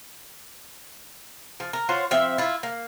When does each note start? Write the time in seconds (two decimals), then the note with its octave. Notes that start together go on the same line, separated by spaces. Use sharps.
1.60 F3
1.73 A#4
1.89 F4 C5 C#5 F#5
2.11 F3 C4 E5
2.38 E4 F4
2.63 A#3